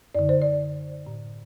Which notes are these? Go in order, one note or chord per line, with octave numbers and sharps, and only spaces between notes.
F#2 D3 D5
C5
D5
A2